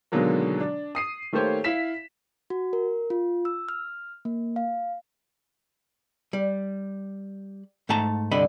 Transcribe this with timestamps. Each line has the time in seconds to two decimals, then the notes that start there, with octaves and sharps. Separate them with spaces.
0.12 B2 D3 D#3 F#3 G#3 A#3
0.61 D4
0.95 D#6 C7 D#7
1.33 D#3 A3 A#3 G4 C5 C#5
1.64 E4 F5 B6 E7
2.50 F#4
2.73 A#4
3.10 F4
3.45 E6
3.69 F6
4.25 A#3
4.56 F5
6.33 G3
7.89 G#2 A3 F#5 A5 A#5
8.31 C2 G2 D3 D#5 B5